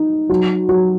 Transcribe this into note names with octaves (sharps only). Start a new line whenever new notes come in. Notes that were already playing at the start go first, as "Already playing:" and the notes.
Already playing: D#4
F#3
F#3